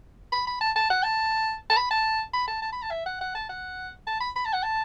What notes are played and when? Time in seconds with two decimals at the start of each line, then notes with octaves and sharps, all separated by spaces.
0.32 B5
0.47 B5
0.61 A5
0.76 A5
0.90 F#5
1.03 A5
1.70 A5
1.77 B5
1.91 A5
2.33 B5
2.47 A5
2.62 A5
2.72 B5
2.82 A5
2.91 E5
3.06 F#5
3.21 F#5
3.35 A5
3.49 F#5
4.07 A5
4.20 B5
4.36 B5
4.45 A5
4.53 F#5
4.63 A5